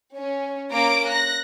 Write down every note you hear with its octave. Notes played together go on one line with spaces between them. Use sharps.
C#4
A#3 C#4 A#5 D6 D7
F#6 A#6